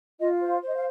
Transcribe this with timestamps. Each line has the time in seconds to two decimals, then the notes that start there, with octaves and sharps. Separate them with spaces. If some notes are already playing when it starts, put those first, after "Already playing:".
0.20 F4 D#5
0.41 C5
0.47 F5
0.61 C5
0.67 D#5
0.75 F5